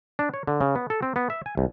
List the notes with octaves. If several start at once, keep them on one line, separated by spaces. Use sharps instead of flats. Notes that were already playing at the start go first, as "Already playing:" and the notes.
D4
C#5
D3
C#3
B3
A4
C4
B3
E5
G#5
C2